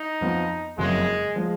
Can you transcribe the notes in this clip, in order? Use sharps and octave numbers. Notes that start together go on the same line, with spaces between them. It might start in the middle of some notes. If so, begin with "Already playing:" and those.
Already playing: D#4
F2 F3 B3
F#1 F2 C#3 F#3 G#3
F3 G#3